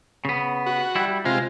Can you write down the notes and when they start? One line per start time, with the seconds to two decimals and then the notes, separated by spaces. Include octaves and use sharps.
0.25 C#3 B3
0.66 F#4
0.96 G3 E4
1.25 C3 G#3 F4